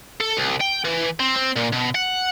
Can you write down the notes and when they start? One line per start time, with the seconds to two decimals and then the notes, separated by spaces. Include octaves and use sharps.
0.20 A4
0.37 C2
0.61 G5
0.85 E3
1.20 C4
1.36 C4
1.56 A#2
1.72 B2
1.95 F#5